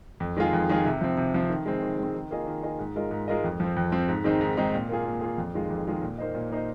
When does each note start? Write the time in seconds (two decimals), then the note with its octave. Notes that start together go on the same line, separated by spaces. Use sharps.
0.20 F2
0.37 D#3 G#3 F4 G#4
0.53 F2
0.69 D#3 G#3 F4 G#4
0.85 C3
1.01 F3 C4
1.17 C3
1.34 F3 C4
1.50 D#3
1.66 G#3 C4
1.83 D#3
1.98 G#3 C4
2.14 D#3
2.31 A#3 F4 G#4 D#5
2.47 D#3
2.63 A#3 F4 G#4 D#5
2.79 G#2
2.96 G#3 F4 A#4 D#5
3.11 G#2
3.28 G#3 F4 A#4 D#5
3.44 F2
3.60 F3 C4
3.76 F2
3.92 F3 C4
4.09 G#2
4.24 D#3 G#3 C4 D#4
4.41 G#2
4.57 D#3 G#3 C4 D#4
4.74 A#2
4.89 A#3 F4 G#4
5.05 A#2
5.21 A#3 F4 G#4
5.38 F2
5.55 D#3 G#3 F4
5.70 F2
5.87 D#3 G#3 F4
6.02 A#2
6.18 A#3 D#4 C5 D#5
6.35 A#2
6.51 A#3 D#4 C5 D#5